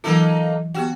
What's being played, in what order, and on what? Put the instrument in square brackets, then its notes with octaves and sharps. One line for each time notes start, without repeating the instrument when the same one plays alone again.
[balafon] E3 F#3 F4 [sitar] A#3 D#4 A4
[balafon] B3 G4 G5 [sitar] F#4